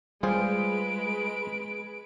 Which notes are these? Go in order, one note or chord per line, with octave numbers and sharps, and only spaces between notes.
G3 G#3 F4 G#4 B4 C5 D7